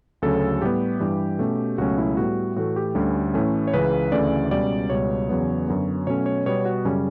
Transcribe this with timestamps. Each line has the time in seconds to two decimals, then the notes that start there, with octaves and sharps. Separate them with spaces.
0.22 D2 C#3 F#3 C#4 A4
0.61 A2 G3 B3 G4
1.00 G2 E3 G3
1.39 B2 A3 C#4
1.78 C#2 B2 F#3 A3 C#4 F#4
1.98 E4
2.17 A2 G3 B3 F#4
2.56 A2 E3 A3 F#4
2.76 G4
2.95 D2 D3 G3 C#4 A4
3.34 A2 E3 A3 C#4
3.67 C#5
3.74 C#2 C#3 E3 B4
4.12 D2 C#3 E3 A3 C#4 D5
4.51 C#2 B2 G3 C#4 D5
4.90 C#2 B2 G3 C#5
5.29 E2 C#3 F#3 B3
5.67 F#2 D3 F#3 B3
6.07 B2 F#3 A3 C#4 C#5
6.26 C#5
6.46 B2 G3 B3 C#5
6.65 F#4
6.85 F#2 C#3 G3 C#4